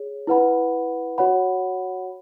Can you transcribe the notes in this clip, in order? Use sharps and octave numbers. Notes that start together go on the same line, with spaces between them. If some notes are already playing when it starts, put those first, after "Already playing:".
Already playing: G#4 C#5
E4 B4 F#5 B5
F#4 C#5 F#5 B5